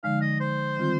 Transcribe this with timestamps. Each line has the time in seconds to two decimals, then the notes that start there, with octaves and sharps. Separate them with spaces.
0.03 D3 F3 G#3 D#4 F5
0.21 D#5
0.40 C5
0.77 D#3 G3 C4 F4